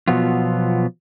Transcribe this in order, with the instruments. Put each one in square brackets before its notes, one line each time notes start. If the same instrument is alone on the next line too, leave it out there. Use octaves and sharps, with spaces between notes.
[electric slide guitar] B2 F3 F#3 B3 F4